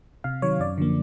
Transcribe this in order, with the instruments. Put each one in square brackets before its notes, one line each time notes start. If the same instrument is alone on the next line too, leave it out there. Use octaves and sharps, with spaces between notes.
[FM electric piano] C3 F5
D#3 F#3 C#5
F#2 D5
D3 F3 A#3